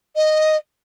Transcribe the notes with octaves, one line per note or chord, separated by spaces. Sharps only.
D#5